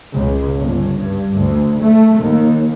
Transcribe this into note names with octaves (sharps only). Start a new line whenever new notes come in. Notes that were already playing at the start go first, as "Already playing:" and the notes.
C#2
G1
G2
D2
A3
D#2